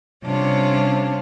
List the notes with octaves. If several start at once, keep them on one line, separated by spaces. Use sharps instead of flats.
C3 G3 C#4 D4 F4